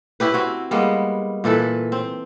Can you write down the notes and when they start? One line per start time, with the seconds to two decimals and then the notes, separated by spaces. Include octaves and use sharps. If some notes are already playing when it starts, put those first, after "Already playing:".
0.20 C#4 E4 G4 B4
0.34 C4 F#4
0.71 G3 G#3 A#3 B3
1.44 A#2 E3 A4 B4
1.92 C4